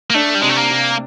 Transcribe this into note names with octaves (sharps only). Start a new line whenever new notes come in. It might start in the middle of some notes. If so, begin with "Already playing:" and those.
A#3
A3 D4
G3
C3 G#3
A3
A#3
C3